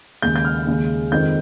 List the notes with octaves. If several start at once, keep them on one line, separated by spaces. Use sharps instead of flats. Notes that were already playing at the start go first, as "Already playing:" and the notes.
D#2 C#3 G#3 G6
G6
F6
D#2 C#3 G#3
F2 D#3 G#3 G6